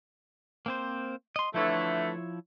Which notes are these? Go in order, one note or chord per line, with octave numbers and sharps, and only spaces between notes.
A#3 C4 C5
D#5 C6
D3 E3 F3 A3 E4 C#5